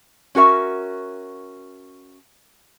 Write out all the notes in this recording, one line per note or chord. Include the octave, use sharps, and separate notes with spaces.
C#4 F#4 A#4 E5